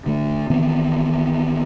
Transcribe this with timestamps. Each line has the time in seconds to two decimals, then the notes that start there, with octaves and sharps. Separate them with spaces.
0.06 D3 A3
0.50 D#3 E3 B3 C4